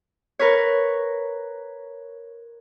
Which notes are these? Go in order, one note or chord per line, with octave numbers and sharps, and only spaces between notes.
A#4 B4 C#5